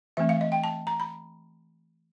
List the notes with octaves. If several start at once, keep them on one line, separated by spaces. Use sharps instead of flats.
E3 A3 C4 E5
F5
D#5
G5
A5
A#5
B5